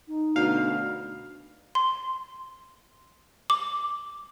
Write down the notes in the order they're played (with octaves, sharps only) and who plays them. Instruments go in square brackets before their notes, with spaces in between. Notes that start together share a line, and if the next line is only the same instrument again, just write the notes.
[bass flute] D#4
[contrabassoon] D2 [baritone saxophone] B2 [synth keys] F5
[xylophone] C6
D6